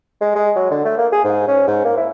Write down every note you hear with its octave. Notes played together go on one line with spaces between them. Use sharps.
G#3
G#3
F#3
D3
A3
A#3
G#4
G#2
C#4
G#2
A#3
E4